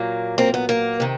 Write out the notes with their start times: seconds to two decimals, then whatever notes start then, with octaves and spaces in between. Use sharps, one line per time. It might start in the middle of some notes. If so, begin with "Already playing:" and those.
Already playing: A#2 F#3 A#3
0.38 A#3 C4
0.54 B3
0.69 A#3
1.00 C3 D#3